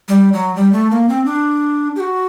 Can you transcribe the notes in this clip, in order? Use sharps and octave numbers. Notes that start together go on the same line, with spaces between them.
G3
F#3
G3
A3
A#3
C4
D4
G4
F#4